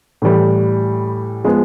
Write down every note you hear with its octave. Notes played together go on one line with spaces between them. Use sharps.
A2 E3 G3
F3 G#3 B3